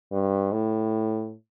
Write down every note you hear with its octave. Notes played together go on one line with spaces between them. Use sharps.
G2
A2